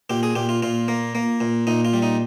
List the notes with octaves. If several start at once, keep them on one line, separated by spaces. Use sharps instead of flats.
A#2 G4
G#4
A#2 G4
F4
A#2 F4
A#3
A#3
A#2
A#2 D#4
F4
G3
D#4